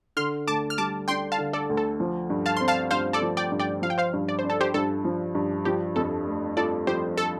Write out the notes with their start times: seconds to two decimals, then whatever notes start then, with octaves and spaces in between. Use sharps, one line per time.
0.16 D3 C6 F6
0.48 D2 A5 D6
0.70 F6
0.78 G3 A5 D6
1.08 D4 G5 C6
1.32 F5 A5
1.38 D3
1.53 A4 D5
1.69 D2
1.77 A4
2.00 F3
2.30 G2
2.46 F5 A5
2.57 C4 C6
2.68 F5 A5
2.91 G2 C5 F5
3.13 A4 D5
3.22 F3
3.37 D5 G5
3.52 G2
3.60 D5 G5
3.82 F3 F5
3.90 G5
3.98 C5 F5
4.13 G2
4.29 D5
4.39 C5
4.44 D4
4.50 A4
4.61 G4 C5
4.74 G2 A4
5.04 F3
5.35 G2
5.65 F3 G4
5.96 F2 A4
6.27 A3
6.57 F4 A4 D5
6.87 F3 G4 C5
7.17 A4